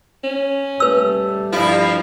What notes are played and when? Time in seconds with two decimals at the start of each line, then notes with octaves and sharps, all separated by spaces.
0.24 C#4
0.80 G3 A3 B4 E6
1.53 G2 F3 E4